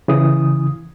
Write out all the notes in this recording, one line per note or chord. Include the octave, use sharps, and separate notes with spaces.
C#3 E3 D#6